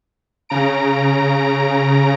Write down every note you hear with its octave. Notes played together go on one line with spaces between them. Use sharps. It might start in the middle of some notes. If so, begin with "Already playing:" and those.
C#3 A#5 D7